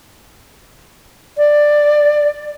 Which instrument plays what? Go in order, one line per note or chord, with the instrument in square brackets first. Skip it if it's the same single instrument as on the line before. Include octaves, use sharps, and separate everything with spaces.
[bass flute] D5